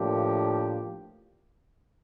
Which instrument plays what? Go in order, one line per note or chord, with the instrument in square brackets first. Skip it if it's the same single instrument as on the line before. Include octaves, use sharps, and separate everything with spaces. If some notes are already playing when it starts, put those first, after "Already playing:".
Already playing: [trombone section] A2 F3 A#3 D4 G4